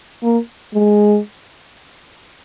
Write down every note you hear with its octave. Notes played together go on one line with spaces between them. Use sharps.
A#3
G#3